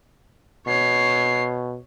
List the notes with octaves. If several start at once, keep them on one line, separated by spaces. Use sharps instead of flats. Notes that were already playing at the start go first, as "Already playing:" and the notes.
B2 C#5 C7